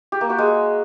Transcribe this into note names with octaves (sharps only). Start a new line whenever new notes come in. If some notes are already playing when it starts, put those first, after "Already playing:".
G4
A#3
F#4
G#3